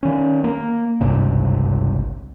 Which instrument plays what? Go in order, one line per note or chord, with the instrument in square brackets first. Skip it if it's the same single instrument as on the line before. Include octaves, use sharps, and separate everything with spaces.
[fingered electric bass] D#3 C#4
A#3
G#1 C#2 G2 C3